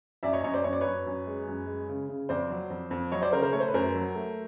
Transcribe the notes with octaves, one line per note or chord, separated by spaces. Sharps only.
F#2 D5 E5
C#5 D#5
F#2 C#5 D#5
C5 D5
F#2 C#5
D5
F#2 B4 C#5
F#2
G#3
F#2
G#3
C#3
C#3
F2 C5 D5
F#3
F2
F2
F#3 C#5 D#5
C5 D5
C#3 A#4 C5
A#4 C5
A3 C#5
C5
B4
F#2 A#4 C5
F#3
A3